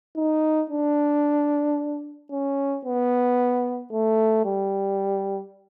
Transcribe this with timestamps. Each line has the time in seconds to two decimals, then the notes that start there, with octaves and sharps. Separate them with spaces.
0.16 D#4
0.70 D4
2.31 C#4
2.85 B3
3.92 A3
4.45 G3